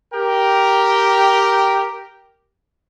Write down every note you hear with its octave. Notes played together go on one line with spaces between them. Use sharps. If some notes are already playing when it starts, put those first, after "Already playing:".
G4 A#4 G5